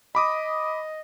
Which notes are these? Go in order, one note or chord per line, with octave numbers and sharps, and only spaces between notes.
D#5 B5 D6 D#6